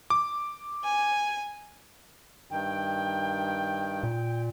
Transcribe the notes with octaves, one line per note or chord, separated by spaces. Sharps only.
D6
G#5
G2 D#3 G5
A#2